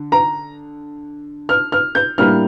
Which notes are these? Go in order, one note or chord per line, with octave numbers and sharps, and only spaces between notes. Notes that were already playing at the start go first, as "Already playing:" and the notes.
Already playing: D3
A#5
F6
F6
G6
A2 G3 A#3 D4 F6